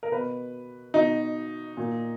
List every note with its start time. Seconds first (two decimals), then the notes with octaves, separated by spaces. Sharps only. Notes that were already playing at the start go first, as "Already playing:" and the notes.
0.03 A#4
0.11 B2 B4
0.94 B2 D#4
1.77 A#2